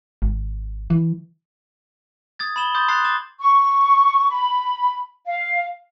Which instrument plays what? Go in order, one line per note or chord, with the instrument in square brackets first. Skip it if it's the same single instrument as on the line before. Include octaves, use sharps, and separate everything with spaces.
[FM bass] G#1
E3
[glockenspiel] D#6 G#6 A6
B5 D#6 E7 F#7 G7
C6 D#6 G6 A6
A#5 C6 D#6 F#6 A6 C7
D6 A6 E7
[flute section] C#6
B5
F5